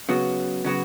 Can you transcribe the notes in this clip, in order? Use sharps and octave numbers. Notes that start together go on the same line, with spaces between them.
C#3 F#3 B3 F#4
C#3 F#3 B3 F#4